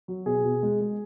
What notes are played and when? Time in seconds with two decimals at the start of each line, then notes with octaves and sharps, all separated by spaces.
0.08 F#3
0.26 B2 G#4
0.44 B2
0.63 G#3
0.81 G#3